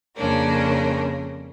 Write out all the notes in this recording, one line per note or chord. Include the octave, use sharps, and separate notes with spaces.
F2 C#3 A#3 C#4 D4 A#4